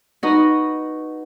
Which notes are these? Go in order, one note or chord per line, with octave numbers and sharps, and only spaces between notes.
D#4 F#4 B4 D#5